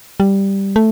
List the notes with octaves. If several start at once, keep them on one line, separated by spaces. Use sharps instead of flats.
G3
A3